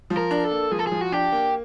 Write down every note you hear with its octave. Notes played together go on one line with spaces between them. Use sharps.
F3
A#4
D4
A4
A#3
F3 G#4
A4
F3 G#4
F#4
D4 G4
A#3